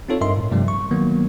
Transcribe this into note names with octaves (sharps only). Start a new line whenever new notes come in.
C4 D#4 F4 A4 C#5
G2 A#4 D#5 E5 C6
A2
G2 C3 F3 G3 A3
C#6
D#3 F#3 A#3 B3